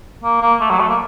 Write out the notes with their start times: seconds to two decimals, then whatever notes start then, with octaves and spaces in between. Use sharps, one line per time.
0.23 A#3
0.41 A#3
0.60 A3
0.70 F#3
0.80 A3
0.89 A#3